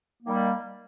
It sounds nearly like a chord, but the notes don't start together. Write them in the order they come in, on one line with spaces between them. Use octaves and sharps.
A#3 D#3 G3